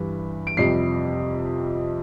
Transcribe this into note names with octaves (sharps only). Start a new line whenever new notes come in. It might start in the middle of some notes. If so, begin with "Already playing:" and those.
Already playing: G2 E3 G3
D7
F2 C3 G3 C7